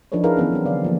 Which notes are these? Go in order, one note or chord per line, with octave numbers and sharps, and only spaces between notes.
F3 D4 D#4 A4 B4 C#5
E4 G#4 A#4 B4 F5
E3 B3 C#4
E3 F#3 C4
D3 D5 F5
F3 A#3